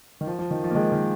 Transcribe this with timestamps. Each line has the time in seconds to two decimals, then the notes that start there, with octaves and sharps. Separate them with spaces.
0.21 D#3
0.27 F3
0.39 F3
0.51 D#3
0.64 F3
0.71 A#3
0.75 D#3 G#3
0.92 D#3